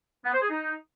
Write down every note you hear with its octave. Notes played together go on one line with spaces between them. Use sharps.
B3
C5
G#4
D#4